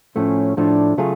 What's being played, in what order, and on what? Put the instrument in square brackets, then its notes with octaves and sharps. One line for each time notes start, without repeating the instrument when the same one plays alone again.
[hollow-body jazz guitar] A2 F3 A3 [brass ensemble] C#4
[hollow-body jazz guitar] A2 F3 A3 [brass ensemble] D4
[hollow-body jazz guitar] C#3 F#3 A3 F4 G#4